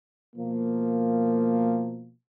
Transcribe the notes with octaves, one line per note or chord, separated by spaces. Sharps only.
B2 F3 A#3